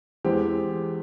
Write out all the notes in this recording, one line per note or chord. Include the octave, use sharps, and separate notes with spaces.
E2 E3 G#3 C4 G4